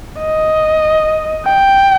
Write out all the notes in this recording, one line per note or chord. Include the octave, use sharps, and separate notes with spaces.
D#5
G5